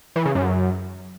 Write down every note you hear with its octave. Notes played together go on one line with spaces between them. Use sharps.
E3
C#3
F#2